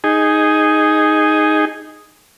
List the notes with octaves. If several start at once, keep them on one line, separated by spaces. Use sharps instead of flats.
D#4 G#4